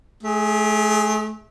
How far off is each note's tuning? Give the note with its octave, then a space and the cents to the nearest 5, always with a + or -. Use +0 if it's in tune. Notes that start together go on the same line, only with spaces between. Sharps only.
A3 -35 G#4 +0